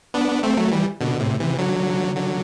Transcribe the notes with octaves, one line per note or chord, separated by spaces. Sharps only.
B3 D4
A3 C4
F#3 A3
E3 G3
B2 D3
A2 C3
C3 E3
D3 F#3
D3 F#3